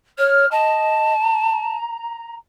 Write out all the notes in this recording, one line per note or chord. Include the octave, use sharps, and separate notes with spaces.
C#5 F6
D#5 A5
A#5